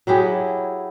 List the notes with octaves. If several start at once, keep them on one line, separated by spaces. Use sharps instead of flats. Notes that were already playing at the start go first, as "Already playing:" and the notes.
F#3 E4 G4 G#4